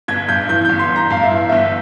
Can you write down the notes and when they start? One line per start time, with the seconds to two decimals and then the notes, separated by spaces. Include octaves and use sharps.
0.08 G1 G#6
0.29 G2 G6
0.49 E3 G6
0.65 G1 G6
0.79 C6
0.90 G1
0.96 A#5
1.10 G2 F5
1.23 E5
1.31 E3
1.49 G1 E5